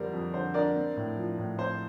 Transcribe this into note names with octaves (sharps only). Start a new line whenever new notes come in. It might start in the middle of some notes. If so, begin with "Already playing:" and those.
Already playing: F2 D3 G3 D4 A#4 C5 D5
F2
D3 C5
D4 A#4 D5
C4
A2
F3
A2
C4 C5